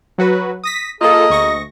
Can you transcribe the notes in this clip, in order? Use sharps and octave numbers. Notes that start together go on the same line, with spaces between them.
F#3 F#4 B4
D#6 A#6 B6
A#3 F4 G#4 A4 D#5
D2 C#6 A#6